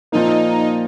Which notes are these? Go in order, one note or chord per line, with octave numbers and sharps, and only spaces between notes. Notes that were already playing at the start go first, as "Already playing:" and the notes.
A#2 F3 A#3 D#4